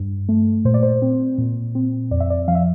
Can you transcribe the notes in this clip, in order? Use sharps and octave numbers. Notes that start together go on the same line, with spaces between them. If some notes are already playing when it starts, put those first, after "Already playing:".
Already playing: G2
A3
A#2 C5
D5
C5
C4
A#2
C4
F2 D5
E5
D5
F3 F5
E5